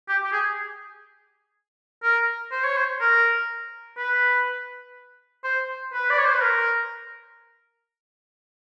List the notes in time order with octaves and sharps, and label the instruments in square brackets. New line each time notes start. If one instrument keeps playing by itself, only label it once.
[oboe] G4
G4
G#4
A#4
C5
C#5
C5
A#4
B4
C5
B4
D5
C#5
C5
B4
A#4